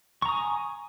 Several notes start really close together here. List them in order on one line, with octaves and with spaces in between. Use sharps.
C#6 A#5 D#6 G#5